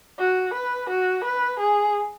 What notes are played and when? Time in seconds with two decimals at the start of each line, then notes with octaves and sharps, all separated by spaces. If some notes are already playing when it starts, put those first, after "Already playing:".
0.19 F#4
0.54 B4
0.90 F#4
1.25 B4
1.60 G#4